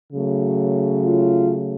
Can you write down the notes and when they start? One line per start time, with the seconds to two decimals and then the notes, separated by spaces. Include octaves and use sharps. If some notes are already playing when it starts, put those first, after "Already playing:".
0.12 C#3 F#3 A3
1.05 F4